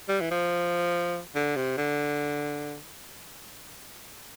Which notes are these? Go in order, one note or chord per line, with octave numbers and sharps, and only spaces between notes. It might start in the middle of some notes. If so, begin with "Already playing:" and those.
G3
E3
F3
D3
C3
D3